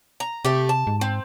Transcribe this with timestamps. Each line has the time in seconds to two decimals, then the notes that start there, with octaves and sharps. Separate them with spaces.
0.20 A#5
0.45 C3 A3 G4
0.69 A5
0.87 G#2
1.01 C4